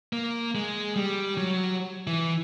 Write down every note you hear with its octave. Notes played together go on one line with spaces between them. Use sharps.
A#3
G#3
G3
F#3
E3